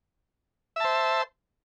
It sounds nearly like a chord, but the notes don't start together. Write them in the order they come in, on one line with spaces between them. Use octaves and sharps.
E5 A5 C5